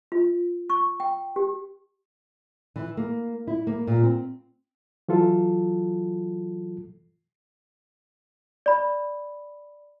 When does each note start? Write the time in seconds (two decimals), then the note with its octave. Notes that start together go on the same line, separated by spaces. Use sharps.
0.12 F4
0.70 C#6
1.00 G5
1.36 G4
2.76 E3
2.97 A#3
3.47 E4
3.67 A#3
3.87 A#2
4.03 C4
5.09 E3 F#3 F4 A4
8.66 D5 B5